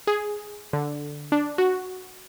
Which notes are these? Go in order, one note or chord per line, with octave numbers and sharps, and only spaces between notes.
G#4
D3
D4
F#4